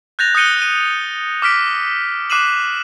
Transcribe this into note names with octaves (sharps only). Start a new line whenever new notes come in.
F#6 G6 A6 A#6 F7
D#6 F#6 G6 C#7 D#7 G7
D#7
D6 F6 B6 D7
D6 F#6 C7 D#7 E7 F#7